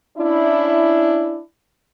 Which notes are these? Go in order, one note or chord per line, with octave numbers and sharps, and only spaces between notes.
C#4 D4 E4